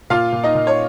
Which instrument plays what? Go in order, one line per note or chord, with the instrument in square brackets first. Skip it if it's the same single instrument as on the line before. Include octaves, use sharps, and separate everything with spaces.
[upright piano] A#2 F4 F5
A#2
D#4 D#5
A#2
C#5